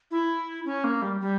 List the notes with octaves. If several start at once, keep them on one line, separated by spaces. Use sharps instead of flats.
E4
C#4
A#3
G3
G3